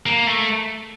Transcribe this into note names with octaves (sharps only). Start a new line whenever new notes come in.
A#3
A3